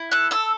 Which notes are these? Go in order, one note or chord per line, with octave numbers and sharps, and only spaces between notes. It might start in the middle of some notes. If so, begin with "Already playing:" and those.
Already playing: E4
A4 F#6
A4 E6